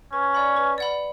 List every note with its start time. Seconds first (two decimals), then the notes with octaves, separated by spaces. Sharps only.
0.12 C#4 B4
0.34 D5 F#5 B5
0.57 B4
0.78 D5 F#5 B5